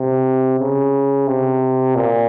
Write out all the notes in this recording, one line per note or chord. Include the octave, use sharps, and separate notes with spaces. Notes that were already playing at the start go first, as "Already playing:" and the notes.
Already playing: C3
C#3
C3
A#2